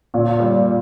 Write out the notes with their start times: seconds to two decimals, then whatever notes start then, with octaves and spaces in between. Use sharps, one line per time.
0.14 A#2
0.40 G3